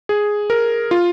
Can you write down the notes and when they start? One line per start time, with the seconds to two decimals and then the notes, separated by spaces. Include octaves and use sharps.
0.09 G#4
0.50 A#4
0.91 F4